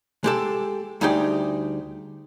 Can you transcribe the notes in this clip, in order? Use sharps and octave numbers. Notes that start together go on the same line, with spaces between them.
G#3 G4 A4
D2 G3 D#4 G#4 D5 G5